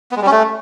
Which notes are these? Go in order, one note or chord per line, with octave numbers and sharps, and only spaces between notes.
B3
G#3
G3
C#4
A3